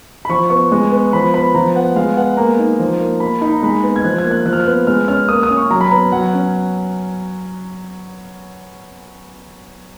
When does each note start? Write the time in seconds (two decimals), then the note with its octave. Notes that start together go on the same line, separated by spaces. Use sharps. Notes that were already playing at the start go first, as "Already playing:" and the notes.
0.25 B5
0.29 F3 C#6
0.50 B3 C#6
0.72 G#3
0.92 B3
1.13 F3 B5
1.34 B3 B5
1.54 F3 A#5
1.75 B3 F#5
1.96 G#3 F5
2.17 B3 F#5
2.37 A#3 A#5
2.59 D#4
2.79 F3
2.99 A#3
3.20 A#3 B5
3.41 D#4 B5
3.53 A#5
3.62 G#3 B5
3.83 B3
3.96 G#6
4.04 F3 F#6
4.18 G#6
4.24 A#3
4.31 F#6
4.46 F3 F#6
4.53 F6
4.60 F#6
4.67 B3
4.87 G#3 F6
5.08 C#4 F6
5.29 A#3 D#6
5.43 D#6
5.49 C#4
5.57 C#6
5.71 F#3 A#5
5.81 B5
5.91 B3 A#5
6.12 F#3 F#5
6.33 C#4